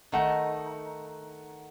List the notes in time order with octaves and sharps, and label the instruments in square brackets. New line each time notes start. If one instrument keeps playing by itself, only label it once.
[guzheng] D#3 A3 D#4 [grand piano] F#5